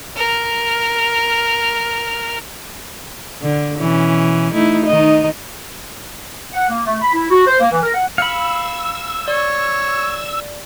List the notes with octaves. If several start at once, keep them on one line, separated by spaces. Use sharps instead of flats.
A#4 F6
D3
B2 E3 C#4
A3 D#4 E4
D#3 D#4 D#5
F#5
A#3
A3
B5
E4
F#4
C5
A#3
E3
A#4
F#5
F5 B5 E6 C#7
C#5 D5